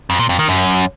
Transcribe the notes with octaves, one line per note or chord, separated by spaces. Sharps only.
F2
A#2
F2
D#3
F#2